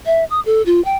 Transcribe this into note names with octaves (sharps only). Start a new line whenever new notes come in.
E5
D#6
A4
F4
G5